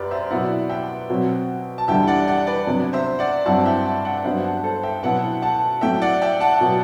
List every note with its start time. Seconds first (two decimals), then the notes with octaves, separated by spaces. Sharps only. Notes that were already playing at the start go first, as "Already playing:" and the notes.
Already playing: F#2 G4 B4 D5
0.11 C5 E5
0.30 B2 F#3 B3 E4 D5 F#5
0.70 E5 G5
1.09 B2 F#3 C4
1.78 A5
1.88 E2 D3 G3 D4 E5 G5
2.07 D5 F#5
2.27 D5 F#5
2.47 B4 D5
2.67 C3 F#3 B3 D4
2.93 C5 E5
3.19 D5 F#5
3.45 G2 F#3 C4 E4 F#5 A5
3.65 E5 G5
3.85 F#5 A5
4.05 D5 F#5
4.24 G2 F#3 B3 D4 C5 E5
4.44 F#5 A5
4.63 A4 C5
4.83 E5 G5
5.03 B2 F#3 B3 E4 F#5 A5
5.42 F#5 A5
5.81 A2 F#3 A3 E5 G5
6.02 D5 F#5
6.22 E5 G5
6.40 F#5 A5
6.61 B2 F#3 B3